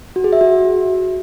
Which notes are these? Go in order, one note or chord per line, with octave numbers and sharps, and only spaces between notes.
F#4
G#4
E5
F#4